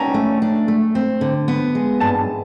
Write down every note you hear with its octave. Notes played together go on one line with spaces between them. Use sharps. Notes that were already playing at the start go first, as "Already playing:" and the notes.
Already playing: C#4 G5 A5 A#5
A3
D4
A3
C4
D3
B3
G#3
G2 A5